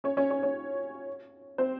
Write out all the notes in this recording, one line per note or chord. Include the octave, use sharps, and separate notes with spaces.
C#4 C#5
C#4 C#5
C#4 C#5
C#4 C#5
C4 C5